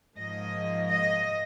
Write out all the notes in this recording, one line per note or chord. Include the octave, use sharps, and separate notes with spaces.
G#2 F3 A#3 D#5
D#5